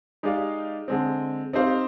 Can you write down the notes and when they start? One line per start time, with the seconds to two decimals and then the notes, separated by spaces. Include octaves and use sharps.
0.23 G#3 D#4 G4 D5 F5
0.88 D3 G#3 C4
1.53 C4 D#4 G4 C5 F5